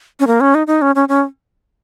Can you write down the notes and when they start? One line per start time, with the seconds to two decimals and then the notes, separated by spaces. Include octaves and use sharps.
0.20 C#4
0.27 A#3
0.40 C#4
0.54 D#4
0.67 D#4
0.82 C#4
0.95 C#4
1.08 C#4